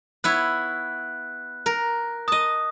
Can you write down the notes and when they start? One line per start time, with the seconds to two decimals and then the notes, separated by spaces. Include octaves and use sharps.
0.24 B3 E4 C#5 F#6
1.66 A#4
2.28 D#5 A5 D#6